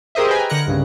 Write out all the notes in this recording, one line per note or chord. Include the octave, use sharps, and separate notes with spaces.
G4 G#4 A#4 C5 D#5 E5
B4 G5 G#5 A#5
D3 A#4 F#6 A#6 C#7
C2 G2 C#3